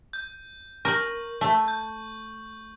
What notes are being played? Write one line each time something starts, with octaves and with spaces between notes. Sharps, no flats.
G6
A#4 C#6 G6 F#7
A3
G6